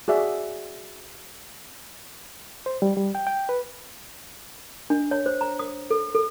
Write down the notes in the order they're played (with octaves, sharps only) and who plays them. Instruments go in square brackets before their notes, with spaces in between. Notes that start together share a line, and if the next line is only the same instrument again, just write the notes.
[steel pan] F#4 G#4 D5 E5
[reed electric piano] C5
G3
G3
G5
G5
B4
[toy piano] D4
C#5
C5
A#5
D#6
A4
A4